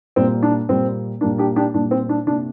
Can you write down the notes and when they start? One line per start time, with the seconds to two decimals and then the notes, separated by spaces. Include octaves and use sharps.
0.16 A#2 G3 A#3 C4
0.43 D4
0.69 A#2 G3 A#3 C4
1.21 A#2 G3 A#3 D4
1.38 D4 G4
1.56 D4 G4
1.74 A#2 G3 A#3 D4
1.91 C4
2.09 D4
2.27 C3 D4
2.30 A#3